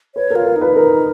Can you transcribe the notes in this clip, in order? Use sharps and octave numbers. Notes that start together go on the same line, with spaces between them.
B4 C#5
A#4
F4
A#4
D#4
B4
A#4